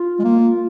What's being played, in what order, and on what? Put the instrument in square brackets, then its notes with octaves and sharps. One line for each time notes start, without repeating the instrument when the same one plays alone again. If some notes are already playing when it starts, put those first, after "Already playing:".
Already playing: [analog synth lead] F4
[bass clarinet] G#3
A#3